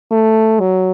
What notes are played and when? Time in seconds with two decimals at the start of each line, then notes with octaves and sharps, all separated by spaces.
0.11 A3
0.60 F#3